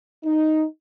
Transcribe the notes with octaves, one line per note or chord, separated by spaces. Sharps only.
D#4